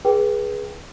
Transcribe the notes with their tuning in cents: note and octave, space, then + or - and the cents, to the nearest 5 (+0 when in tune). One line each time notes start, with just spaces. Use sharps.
G#4 +0 B4 -25 G5 +0